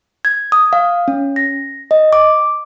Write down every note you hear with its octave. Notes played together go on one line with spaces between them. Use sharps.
G#6
D#6
F5
C#4
A#6
D#5
D6